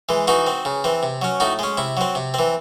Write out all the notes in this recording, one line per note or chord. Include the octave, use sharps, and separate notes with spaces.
E3 G#3
E3 D#4 F#4
C4
C#3
E3 C4
C3
F#3 C#4
A2 D#4 F#4
G#3 C#4
C3 E4
F#3 C4
C3
E3 C4